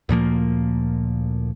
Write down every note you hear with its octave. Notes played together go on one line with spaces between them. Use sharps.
D2 A#2 F3 A#3